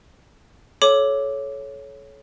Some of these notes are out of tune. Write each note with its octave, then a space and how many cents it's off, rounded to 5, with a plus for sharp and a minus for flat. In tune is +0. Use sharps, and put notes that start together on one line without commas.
A4 -35 C#5 +0 D6 +0